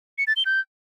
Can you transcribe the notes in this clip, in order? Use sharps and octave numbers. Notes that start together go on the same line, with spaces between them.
C#7
A6
G7
G6